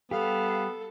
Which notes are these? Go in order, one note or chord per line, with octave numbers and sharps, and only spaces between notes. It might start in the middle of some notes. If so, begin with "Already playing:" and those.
G3 B3 G4 A4 F5